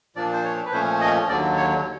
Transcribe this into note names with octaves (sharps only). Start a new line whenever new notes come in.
A#2 F3 A#3 D4 D5
C5
C#5
B4
A#2 F3 A3 C#4 C5
D#5
D#2 D3 F#3 D5
C#5